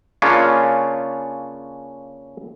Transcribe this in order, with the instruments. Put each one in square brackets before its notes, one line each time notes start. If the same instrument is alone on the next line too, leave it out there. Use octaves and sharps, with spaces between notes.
[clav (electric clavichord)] C#3 A#3 C#4 D4 F4